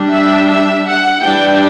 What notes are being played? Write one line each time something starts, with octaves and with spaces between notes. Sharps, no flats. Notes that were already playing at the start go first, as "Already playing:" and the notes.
Already playing: G3 D4
E5
E5
F#5
E3 G3 D4 G5